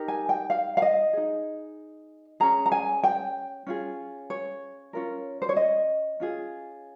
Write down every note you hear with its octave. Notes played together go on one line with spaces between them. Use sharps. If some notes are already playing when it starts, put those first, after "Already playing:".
Already playing: D#4 G4 A#4
G#5
G5
F5
F5
D#5
D#4 G#4
C#4 G#4 A#5
A#5
G#5
G5
C#4 F4 G#4
C#5
C#4 F4 A#4
C5
C#5
D#5
C#4 F4 G#4